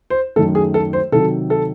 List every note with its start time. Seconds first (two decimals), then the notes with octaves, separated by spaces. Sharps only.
0.10 C5
0.36 F#2 D#3 A3 A4
0.55 G#4
0.74 A4
0.93 C5
1.12 C3 D#3 F#3 A4
1.50 A4